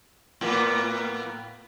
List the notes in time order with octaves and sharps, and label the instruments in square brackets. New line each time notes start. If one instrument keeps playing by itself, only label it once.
[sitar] A2 A#3 B3